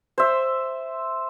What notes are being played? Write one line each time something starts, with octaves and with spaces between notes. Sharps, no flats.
C5 E5